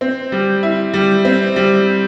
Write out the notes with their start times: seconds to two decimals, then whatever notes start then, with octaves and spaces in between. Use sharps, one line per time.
0.01 C4
0.32 G3
0.63 E4
0.94 G3
1.25 C4
1.56 G3